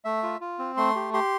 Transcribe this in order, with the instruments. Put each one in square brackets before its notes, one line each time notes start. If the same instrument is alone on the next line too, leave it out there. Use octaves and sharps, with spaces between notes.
[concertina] A3 E5
F4
F4
C4
A3 C6
G4
G4 C6